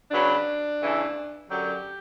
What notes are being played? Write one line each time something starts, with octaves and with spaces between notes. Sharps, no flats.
C#3 F#3 B3 D4
C#3 E3 A3
F#2 D3 F#3 G4